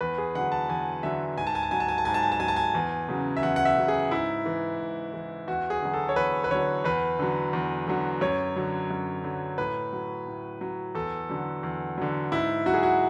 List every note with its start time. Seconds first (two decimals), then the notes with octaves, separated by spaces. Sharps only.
0.01 E2 B4
0.18 G#4
0.35 D3 F#3 F#5
0.52 A5
0.69 E2 G#5
1.03 D3 F#3 E5
1.37 G#2 G#5
1.47 A5
1.55 G#5
1.63 A5
1.71 F#3 G#5
1.80 A5
1.88 G#5
1.98 A5
2.05 G#2 G#5
2.14 A5
2.23 G#5
2.32 A5
2.40 F#3 G#5
2.48 A5
2.56 G#5
2.75 E2
3.08 C#3 F#3
3.37 E5
3.43 E2 F#5
3.56 F#5
3.65 E5
3.77 C#3 F#3
3.88 G#4
4.11 G#2 E4
4.46 E3
4.80 G#2
5.14 E3
5.48 E2 F#4
5.70 G#4
5.82 D3 F#3
5.94 A4
6.09 C#5
6.16 E2 B4
6.44 B4
6.50 D3 F#3 C#5
6.84 E2 B4
7.19 D3 F#3
7.53 E2
7.87 D3 F#3
8.21 F#2 C#5
8.56 D3 F#3
8.91 F#2
9.24 D3 F#3
9.58 A2 B4
9.93 F#3
10.27 A2
10.61 F#3
10.95 E2 A4
11.29 D3 F#3
11.63 E2
11.98 D3 F#3
12.32 G#2 E4
12.66 F#3 F#4
12.74 G#4
12.83 F#4